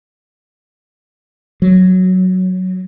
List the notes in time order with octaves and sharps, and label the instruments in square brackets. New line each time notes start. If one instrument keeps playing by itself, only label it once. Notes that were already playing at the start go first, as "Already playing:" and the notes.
[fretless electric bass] F#3